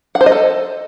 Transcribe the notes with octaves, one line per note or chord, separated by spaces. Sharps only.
F#5
C5
D#5
A4